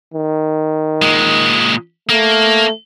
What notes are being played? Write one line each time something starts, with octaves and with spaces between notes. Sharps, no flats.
D#3
A#2 G#3
A3 A#3